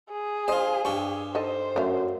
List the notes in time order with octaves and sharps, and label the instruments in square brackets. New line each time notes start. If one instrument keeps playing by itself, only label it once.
[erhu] G#4
[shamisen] D3 D#5 [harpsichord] F4 C5
[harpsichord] G2 G4 C#6 [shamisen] G3
[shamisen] D#4 A4 D#5 [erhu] C5
[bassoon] F#2 [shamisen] A3 C#4 F5